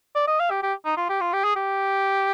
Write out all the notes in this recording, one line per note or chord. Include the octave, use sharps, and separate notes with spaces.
D5
D#5
F5
G4
G4
D#4
F4
G4
F4
G4
G#4
G4